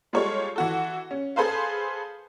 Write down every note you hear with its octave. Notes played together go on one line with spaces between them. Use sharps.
G3 G#3 F4 G4 A4 C#5
E3 F#4 A4
C#4
G#4 A4 B4 C5 F5